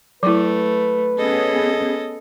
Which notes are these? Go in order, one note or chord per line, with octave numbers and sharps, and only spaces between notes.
F#3 A3 E4 B4
B3 C#4 G#4 A4 D#5